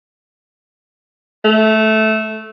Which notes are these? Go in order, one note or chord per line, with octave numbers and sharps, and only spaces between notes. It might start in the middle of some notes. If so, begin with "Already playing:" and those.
A3